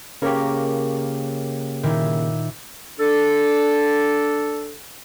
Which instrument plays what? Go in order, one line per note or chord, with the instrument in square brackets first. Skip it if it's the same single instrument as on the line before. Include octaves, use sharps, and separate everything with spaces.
[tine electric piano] C#3 A#3 G4 [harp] A#4 C#5
[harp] A#2 D#3 E4
[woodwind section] D4 A4